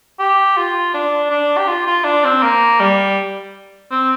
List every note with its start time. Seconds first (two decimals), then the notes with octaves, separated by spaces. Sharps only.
0.19 G4
0.57 F4
0.94 D4
1.30 D4
1.58 G4
1.68 F4
1.87 F4
2.05 D4
2.24 C4
2.43 A#3
2.80 G3
3.91 C4